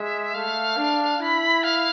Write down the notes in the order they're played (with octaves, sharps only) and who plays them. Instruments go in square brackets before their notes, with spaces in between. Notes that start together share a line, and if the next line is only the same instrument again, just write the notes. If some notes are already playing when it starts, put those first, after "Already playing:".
Already playing: [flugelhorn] G#3 [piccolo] E5
[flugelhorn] A3 [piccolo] F5
[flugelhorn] D4
[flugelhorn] E4 [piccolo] B5
[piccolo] F5